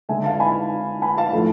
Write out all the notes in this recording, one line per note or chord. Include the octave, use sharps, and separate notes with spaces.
D3 G#3 E5 G#5
F5 A5
G#5 B5
G#5 B5
F5 A5
A2 F3 A3